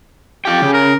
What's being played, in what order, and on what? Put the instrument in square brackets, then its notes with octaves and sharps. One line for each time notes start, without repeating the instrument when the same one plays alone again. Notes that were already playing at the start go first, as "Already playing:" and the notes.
[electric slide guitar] F4 G5 [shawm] G4
[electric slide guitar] C#3
[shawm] A#4